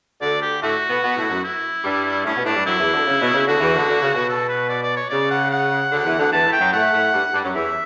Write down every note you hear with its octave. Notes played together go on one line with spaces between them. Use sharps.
D2 D3 D5
G4
A2 A3 F#4
B2 B3
B2 B3
A2 A3
F#2 F#3
E4
G2 G3
A2 A3 C#4
B2 B3
A2 A3 D4
G2 G3
F#2 F#3 E4
E2 E3
D2 D3
C#3
B2
C#3
D2 D3 F#4
E2 E3
D2 D3
D2 D3
C#3
B2
A4
B4
D5
D5
C#5
C#3 D5
F#5
F#5
D2 D3
E2 E3
D2 D3
E2 E3 A5
A2 A3
G5
F#2 F#3
A2 A3 F#5
A2 A3
G2 G3
G2 G3
F#2 F#3
E2 E3 E5